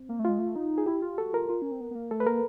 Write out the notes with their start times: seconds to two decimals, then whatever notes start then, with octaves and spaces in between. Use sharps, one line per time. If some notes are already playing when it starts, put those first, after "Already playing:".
Already playing: C4
0.09 A#3
0.19 A3
0.25 G#3 F4
0.39 A3
0.56 D#4
0.78 G#4
0.86 E4 G4
1.02 F4
1.18 F#4 A4
1.33 F4 A#4
1.49 F4
1.62 C#4
1.72 C4
1.81 B3
1.91 B3
1.95 A#3
2.11 A3 A4
2.20 B4
2.26 A#3 A#4